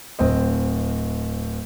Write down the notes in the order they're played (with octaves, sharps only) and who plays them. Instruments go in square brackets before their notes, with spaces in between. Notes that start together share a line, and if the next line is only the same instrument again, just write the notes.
[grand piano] D1 C4 D#5